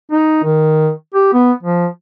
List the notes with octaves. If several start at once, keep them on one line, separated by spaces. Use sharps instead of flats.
D#4
D#3
G4
B3
F3